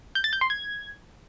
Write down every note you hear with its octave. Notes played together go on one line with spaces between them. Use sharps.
G6
A6
G6
C6
G#6